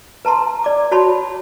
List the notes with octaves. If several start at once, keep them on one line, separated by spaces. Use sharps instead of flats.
B4 A5 A#5 C6
D5 D6
F#4 C#5 A5 B5 C6